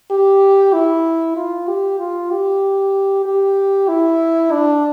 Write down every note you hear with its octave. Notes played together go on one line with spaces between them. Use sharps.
G4
E4
F4
G4
F4
G4
G4
E4
D4